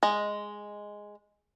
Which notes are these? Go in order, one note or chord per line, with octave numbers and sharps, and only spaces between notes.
G#3 D#5